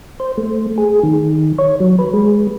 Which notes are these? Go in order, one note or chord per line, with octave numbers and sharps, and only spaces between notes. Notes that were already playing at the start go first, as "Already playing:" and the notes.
C5
A3
G#4
D#3
C#5
F#3
B4
G#3